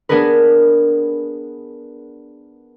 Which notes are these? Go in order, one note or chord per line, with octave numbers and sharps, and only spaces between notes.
B3 D4 G#4 A#4 B4